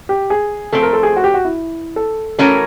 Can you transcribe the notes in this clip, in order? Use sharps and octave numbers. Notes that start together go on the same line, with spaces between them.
G4
G#4
F3 A3 C4 A4
A#4
A4
G#4
F#4
G4
F#4
E4
A4
E3 A3 C#4 F#4 A4 A#4